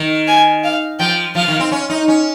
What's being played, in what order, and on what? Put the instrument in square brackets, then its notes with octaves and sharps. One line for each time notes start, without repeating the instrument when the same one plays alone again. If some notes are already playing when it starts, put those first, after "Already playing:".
Already playing: [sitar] D#3
[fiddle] G#5
F5
[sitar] F3 [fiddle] G5
[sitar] F3 [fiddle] F5
[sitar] D#3
C4
C#4
D#4
C#4